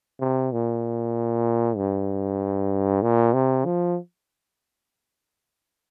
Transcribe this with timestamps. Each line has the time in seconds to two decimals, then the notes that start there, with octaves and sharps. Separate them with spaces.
0.21 C3
0.52 A#2
1.77 G2
3.03 A#2
3.34 C3
3.65 F3